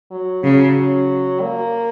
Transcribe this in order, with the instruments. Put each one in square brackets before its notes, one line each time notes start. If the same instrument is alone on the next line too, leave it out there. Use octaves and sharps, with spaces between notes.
[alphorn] F#3
[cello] C#3 [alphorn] F#3
[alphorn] A#3